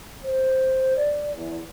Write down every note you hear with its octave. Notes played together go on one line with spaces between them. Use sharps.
C5
D5
E2